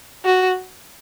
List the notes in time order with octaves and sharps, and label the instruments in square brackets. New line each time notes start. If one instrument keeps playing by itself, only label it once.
[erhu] F#4